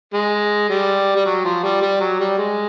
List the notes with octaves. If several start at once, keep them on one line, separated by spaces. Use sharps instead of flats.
G#3
G3
G3
F#3
F3
G3
G3
F#3
G3
G#3